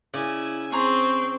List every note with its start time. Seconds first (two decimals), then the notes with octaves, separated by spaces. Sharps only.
0.14 C#3 E4 D5 G#5
0.72 C4 G#4 A#5 C6 C#6